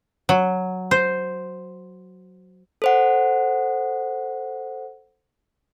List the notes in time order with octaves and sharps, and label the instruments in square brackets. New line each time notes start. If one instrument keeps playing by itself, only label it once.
[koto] F#3
C5
[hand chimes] A4 C5 F#5